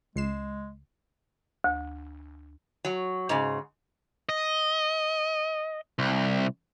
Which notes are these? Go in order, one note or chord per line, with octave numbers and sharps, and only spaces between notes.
C#2 G#3 C7 E7
D2
F#3
G#2 C#3
D#5
C2